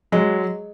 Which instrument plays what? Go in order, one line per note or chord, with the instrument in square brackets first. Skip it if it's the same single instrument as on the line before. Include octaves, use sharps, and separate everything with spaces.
[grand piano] F#3 [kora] G#3